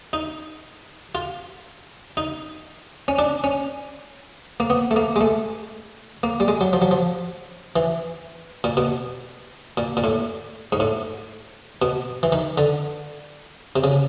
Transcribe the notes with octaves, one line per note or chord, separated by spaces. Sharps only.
D#4
F4
D#4
C#4
D4
C#4
A#3
B3
A3
A#3
G#3
A3
A#3
G3
G#3
F#3
F3
F#3
F3
E3
A#2
B2
A#2
A#2
A2
G#2
A2
B2
E3
D#3
D3
C3
C#3